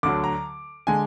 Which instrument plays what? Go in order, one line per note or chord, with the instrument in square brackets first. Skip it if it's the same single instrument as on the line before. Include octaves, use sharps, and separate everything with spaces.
[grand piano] D2 D6
D3 F#3
A#5
D3 G#3 G#5